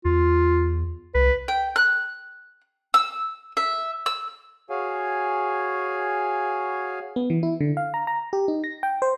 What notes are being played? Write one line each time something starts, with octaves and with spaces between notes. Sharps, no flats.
E2 F4
C2 B4
G5
F#6
E6
E5
E6
F#4 G#4 C#5 F5 G#5
B3
E3
E4
D3
F5
A#5
A#5
G4
D#4
A#6
G5
C5